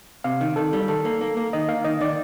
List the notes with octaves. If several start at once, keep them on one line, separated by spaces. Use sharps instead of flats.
C3 F5
D#3
D#3 A4
G3
D#3 A4
A#3
A#3
A#3
D#3 D#5
A#3 F5
D#3 D#5
D#3 D5